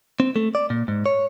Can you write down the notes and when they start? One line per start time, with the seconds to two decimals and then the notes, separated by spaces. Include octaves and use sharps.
0.20 C4
0.36 A3
0.55 D5
0.70 A#2
0.88 G#2
1.06 C#5